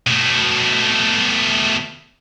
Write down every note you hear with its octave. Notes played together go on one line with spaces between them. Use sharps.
B2 A3